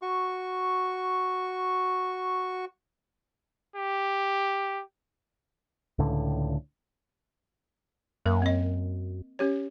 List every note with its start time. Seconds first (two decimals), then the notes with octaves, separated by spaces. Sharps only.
0.02 F#4 C#6
3.76 G4
5.99 C#2 A2 D3
8.26 F#2 A#3 A#4
8.42 C4 D#5
9.39 C#4 G4 C#5